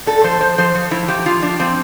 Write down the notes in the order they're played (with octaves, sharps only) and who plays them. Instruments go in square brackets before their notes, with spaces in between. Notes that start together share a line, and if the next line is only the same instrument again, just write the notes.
[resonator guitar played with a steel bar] A#2 A4
F3 C5
F3 C5
F3 C5
F3
F3 E4
F3 G4
F3 F4
F3 D4
F3 C4